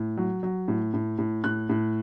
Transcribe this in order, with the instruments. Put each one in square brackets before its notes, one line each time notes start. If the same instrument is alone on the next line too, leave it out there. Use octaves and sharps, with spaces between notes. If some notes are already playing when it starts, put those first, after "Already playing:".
Already playing: [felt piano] A2
F#3
F#3
A2
A2
A2
A2 F#6
A2